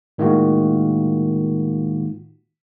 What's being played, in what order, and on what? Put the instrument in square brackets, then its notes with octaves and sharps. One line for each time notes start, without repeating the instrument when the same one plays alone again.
[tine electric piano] A2 D#3 G#3 A#3 F4 F#4